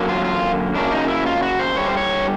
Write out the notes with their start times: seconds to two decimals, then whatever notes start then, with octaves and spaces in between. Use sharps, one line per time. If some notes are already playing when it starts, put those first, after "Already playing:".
Already playing: F#2 D3 F#3 A#3
0.09 F4
0.25 F4
0.75 F#2 C#3 F#3 A#3 D4
0.92 D#4
1.08 E4
1.26 F4
1.42 F#4
1.59 C5
1.75 G2 D3 G3 C#5
1.86 C5
1.97 C#5